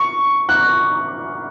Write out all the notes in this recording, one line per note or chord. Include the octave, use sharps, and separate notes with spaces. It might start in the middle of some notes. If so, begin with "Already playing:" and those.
Already playing: C#6
F#6